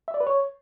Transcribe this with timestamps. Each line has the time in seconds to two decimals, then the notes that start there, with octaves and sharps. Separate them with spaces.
0.08 E5
0.14 D5
0.20 B4
0.27 C#5